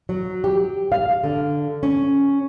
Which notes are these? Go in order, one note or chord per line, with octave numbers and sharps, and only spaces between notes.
F#3
G4
F5
D3
C#4